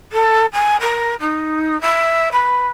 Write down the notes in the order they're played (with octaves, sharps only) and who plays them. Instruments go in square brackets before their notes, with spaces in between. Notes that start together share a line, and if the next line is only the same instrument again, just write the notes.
[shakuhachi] A4
G#5
A#4
D#4
E5
B4